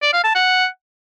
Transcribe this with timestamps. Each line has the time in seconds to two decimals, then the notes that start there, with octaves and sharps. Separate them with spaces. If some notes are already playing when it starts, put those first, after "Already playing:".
0.02 D5
0.13 F5
0.24 A5
0.35 F#5